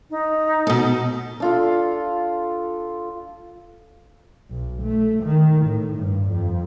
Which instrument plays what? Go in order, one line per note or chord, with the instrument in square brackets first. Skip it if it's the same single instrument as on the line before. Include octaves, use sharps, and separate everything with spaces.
[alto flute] D#4
[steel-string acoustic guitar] B2 A4
[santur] D4 F4 A4
[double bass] B1
A3
D#3
A2
G2
F2